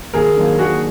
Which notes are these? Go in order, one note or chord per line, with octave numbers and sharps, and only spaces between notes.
D#2 G#4 A#4
D#3 F#3 A#3 D4
D#2 F#4 G#4